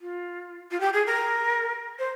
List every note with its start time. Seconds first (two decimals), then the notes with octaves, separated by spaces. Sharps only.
0.01 F4
0.71 F4
0.80 G4
0.93 G#4
1.06 A#4
1.98 C5